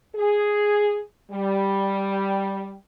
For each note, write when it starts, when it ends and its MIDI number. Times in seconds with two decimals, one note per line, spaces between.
0.16 0.99 68
1.31 2.73 55